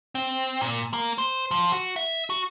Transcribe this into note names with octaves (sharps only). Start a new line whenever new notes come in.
C4
A#2
A#3
C5
F3
F#4
E5
F#4